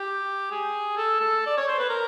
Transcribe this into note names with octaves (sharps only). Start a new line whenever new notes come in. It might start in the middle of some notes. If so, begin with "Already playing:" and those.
Already playing: G4
G#4
A4
A4
D5
C#5
C5
B4
A#4